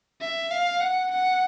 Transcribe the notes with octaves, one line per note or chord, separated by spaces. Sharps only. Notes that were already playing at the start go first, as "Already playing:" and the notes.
E5
F5
F#5
F#5